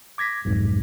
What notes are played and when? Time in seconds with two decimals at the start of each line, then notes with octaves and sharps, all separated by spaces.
0.18 D6 G#6 A#6 B6
0.45 B1 F2 G#2